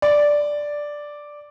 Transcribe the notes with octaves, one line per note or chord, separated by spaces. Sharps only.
D5